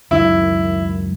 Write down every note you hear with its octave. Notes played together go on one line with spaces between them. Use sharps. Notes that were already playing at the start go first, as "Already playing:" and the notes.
C#2 F#2 D#3 E4